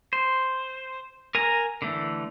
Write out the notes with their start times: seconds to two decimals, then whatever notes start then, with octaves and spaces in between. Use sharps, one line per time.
0.13 C5
1.35 A#4 G#5 A#5
1.82 D3 E3 A3